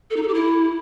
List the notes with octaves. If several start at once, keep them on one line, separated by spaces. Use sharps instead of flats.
A4
D#4
A4
G4
E4